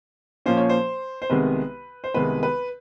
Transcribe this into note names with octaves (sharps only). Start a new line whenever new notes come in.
A#2 F3 A#3 C#4 C5
C#5
C5
C5
C2 C3 D#3 G#3 B3 B4
C5
C2 C3 D#3 G#3 B3 B4
B4